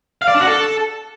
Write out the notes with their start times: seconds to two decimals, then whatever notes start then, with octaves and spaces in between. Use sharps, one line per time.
0.22 F5
0.28 D5
0.34 D4
0.41 F#4
0.47 A4